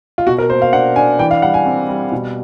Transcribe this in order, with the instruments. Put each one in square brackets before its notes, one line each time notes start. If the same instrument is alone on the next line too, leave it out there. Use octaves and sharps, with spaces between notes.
[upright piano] F4
B2 F#4
A#4
A#3 C5
F5
D4 F#5
D4 G#5
E3 G5
F5
G3 F#5
G#5
C4
G3
B2